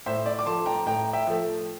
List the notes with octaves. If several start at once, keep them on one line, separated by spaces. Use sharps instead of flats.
A2 C5 E5
D5
D6
F3 A3 A5 C6
G5 A#5
A2 G5 A#5
E5 G5
F3 A3